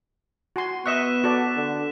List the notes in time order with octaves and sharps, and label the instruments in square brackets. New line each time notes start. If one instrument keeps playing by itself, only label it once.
[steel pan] F#4 G#5 C6
[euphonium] B3 [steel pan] D#5 E5 C#6 [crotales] F#6 B6 E7
[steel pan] F#4 A4 D5
[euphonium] D3